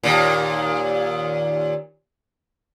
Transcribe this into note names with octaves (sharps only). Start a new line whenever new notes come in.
D#2 A#2